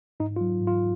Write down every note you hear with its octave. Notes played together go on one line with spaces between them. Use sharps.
G#2 D#4
F4
F#3
G#2
F4